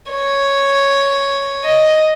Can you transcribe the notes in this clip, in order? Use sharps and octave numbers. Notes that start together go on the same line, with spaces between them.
C#5
D#5